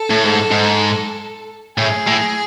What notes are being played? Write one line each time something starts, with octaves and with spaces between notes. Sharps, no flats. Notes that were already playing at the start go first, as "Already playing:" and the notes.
Already playing: A4
A2
G#2
G#2
A2 G#4
A2